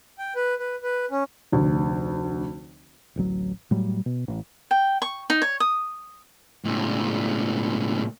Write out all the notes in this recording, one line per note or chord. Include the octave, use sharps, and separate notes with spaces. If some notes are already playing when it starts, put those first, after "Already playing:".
G5
B4
B4
B4
C#4
F1 D2
D1 A1 F#3
A2 F#3 G3
B2
A1
G5
C#6
D#4
C#5
D#6
C#2 A2